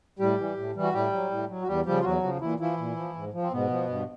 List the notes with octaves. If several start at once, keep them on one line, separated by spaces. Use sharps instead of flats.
A2 G3 G4
E3 G3
A2
E3 G3
F#4
A2 G3 G4
F#3
A2
F#3
F#4
E2 G3 G4
C#3 F3 G3 G4
F4
E2 F#3 F#4
C#3 F3
A#2 E3 E4
E3 F3 E4
A#2
F3
G#2
F3
C4
G#2 B2 B3
F3
G2